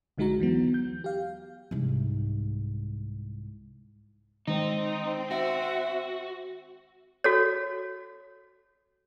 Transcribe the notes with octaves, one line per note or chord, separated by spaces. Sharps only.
B1 D3 G#3 D#4 F#4 A#5
D#2 E3 F#3 B3
G6
G4 F5
C2 G#2
D#3 G#3 C4 D#4
F#4 E5
F#4 A4 C#5